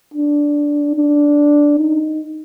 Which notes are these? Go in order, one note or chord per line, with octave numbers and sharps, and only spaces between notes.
D4
D4
D#4